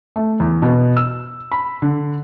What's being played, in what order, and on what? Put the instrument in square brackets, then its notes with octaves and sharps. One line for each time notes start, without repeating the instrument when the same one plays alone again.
[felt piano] A3
E2
B2
E6
B5
D3